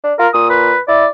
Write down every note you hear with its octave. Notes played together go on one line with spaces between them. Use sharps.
D4
F4 A#4
A#2 D#6
B4
E4 D5